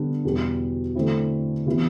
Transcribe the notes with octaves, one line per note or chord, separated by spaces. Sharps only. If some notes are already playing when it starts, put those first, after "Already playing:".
Already playing: D3 G3 B3 D4
E2 B2 G3
D3 A3 C4 E4
C3 E3 B3 E4